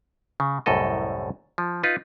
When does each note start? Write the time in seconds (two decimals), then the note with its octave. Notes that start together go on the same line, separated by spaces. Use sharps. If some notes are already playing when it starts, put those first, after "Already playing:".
0.40 C#3
0.66 C2 F#2 A2 A4 D#5
1.58 F3
1.83 D#4 F4 B4